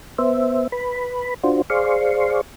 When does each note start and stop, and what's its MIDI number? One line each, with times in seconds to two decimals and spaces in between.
0.18 0.67 59
0.18 0.67 72
0.18 0.67 76
0.72 1.34 71
0.72 1.34 83
1.44 1.62 62
1.44 1.62 65
1.44 1.62 66
1.44 1.62 72
1.70 2.41 68
1.70 2.41 72
1.70 2.41 74
1.70 2.41 77
1.70 2.41 84
1.70 2.41 85